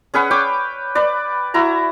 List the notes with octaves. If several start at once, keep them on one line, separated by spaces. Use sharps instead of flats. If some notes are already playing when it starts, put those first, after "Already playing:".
C#4 G#4 B4 F#5
C#5 G5 D6
B4 D5
E4 F#4 A#5